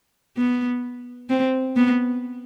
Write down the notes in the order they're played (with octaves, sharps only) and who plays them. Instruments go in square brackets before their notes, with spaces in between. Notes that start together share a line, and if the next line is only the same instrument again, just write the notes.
[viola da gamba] B3
C4
B3